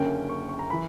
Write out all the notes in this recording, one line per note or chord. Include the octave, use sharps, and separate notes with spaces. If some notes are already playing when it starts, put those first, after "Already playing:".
Already playing: F#1 F#2 D3 A#3 C#4 G5
C#6
C#6
A#5
E3 B5